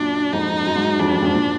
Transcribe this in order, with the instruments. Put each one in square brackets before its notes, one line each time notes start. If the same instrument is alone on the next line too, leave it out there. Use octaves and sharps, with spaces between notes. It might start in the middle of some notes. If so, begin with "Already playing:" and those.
Already playing: [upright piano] F#2 A#2 [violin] D4
[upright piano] F2 G#2 [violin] D#4
[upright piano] F#2
G#2
F#2
[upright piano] F2 [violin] D4
[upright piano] F#2
F2 G#2
A#2